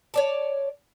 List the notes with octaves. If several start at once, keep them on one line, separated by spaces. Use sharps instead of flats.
C#5 D5 A5